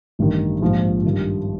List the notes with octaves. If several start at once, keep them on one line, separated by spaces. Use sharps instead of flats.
A1 G2 D#3
A#1 G#2 F3
G2 D#3 G3